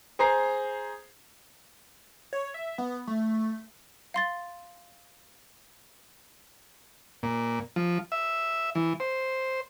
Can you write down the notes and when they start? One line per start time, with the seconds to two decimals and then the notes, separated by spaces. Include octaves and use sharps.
0.19 G#4 C5 A#5 C7
2.33 C#5
2.54 E5
2.78 B3
3.07 A3
4.14 F5 C6 A6
7.23 A#2
7.76 F3
8.12 E5
8.75 E3
9.00 C5